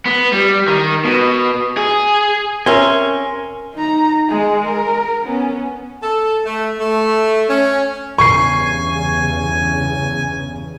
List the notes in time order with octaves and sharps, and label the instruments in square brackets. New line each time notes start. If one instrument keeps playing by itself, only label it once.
[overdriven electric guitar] B3
G3
D#3
B2
G#4
[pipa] C4 C#4 E5 [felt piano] A#4 [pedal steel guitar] G#5 C6
[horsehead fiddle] D#4 A#5
G#3 G#4
A#4
B3 C#4
[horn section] A4
A3
A3
C#4
[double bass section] E2 G2 C#3 [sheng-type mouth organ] G#5 [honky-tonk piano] C#6 C7